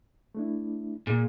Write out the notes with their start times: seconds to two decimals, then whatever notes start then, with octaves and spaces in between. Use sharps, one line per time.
0.35 A3 D4 E4
1.07 A#2 G#4